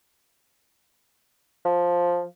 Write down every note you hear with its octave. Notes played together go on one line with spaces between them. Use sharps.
F3